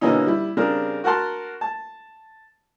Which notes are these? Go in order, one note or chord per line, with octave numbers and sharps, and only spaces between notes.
B2 D3 E3 A#3 C#4 D#4
G3 E4
C#3 G3 C4 D4 G#4 A#4
F#4 A#4 F#5 A5 C6
A5